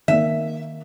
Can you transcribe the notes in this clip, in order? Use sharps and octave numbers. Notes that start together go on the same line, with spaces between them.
D#3 A#3 E5